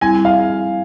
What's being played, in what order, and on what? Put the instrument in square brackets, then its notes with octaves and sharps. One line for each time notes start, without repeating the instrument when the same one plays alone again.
[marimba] G3 C4 E4 [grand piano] G#5
[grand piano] F5